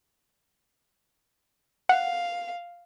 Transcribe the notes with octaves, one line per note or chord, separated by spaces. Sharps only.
F5 F#5